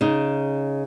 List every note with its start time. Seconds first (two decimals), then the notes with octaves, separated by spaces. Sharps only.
0.01 C#3 D#4